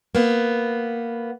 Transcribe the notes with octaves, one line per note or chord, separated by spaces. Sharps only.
A#3 B3